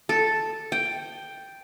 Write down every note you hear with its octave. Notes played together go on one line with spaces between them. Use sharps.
A4
G5